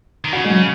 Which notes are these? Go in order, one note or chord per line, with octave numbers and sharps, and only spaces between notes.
D#3
C#3 F#4
G#3
F#3